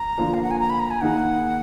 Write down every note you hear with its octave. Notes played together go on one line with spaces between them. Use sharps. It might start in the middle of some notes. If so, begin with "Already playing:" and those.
Already playing: A#5
D3 F3 A#3 F4
F5
F#5
G#5
A#5
B5
A#5
G#5
D#3 A#3 D#4 G#4 F#5